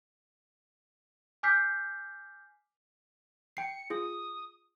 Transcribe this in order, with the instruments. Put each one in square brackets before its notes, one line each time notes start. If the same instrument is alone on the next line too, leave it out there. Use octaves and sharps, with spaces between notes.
[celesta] G#5 D6 F6 G6 B6 C7
[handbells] G5 C7 [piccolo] C#7
[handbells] F4 G#4 [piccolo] D#6